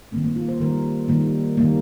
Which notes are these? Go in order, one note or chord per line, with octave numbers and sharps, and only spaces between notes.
D#3 G3 A#3 C4
A#3
F4
C5
D#3 G3 A#3 A#4
D#3 G3 A#3
D#3 G3 A#3